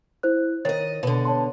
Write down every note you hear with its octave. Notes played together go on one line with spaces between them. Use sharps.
E4 C5 F#6
D#3 C#5 D#5 A6
B2 D3
C#5 A5 C6